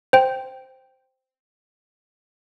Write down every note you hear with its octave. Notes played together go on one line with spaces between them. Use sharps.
C5 G5